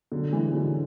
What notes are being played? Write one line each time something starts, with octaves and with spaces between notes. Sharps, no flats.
D3 F#3
E3 G#3
D3 F#3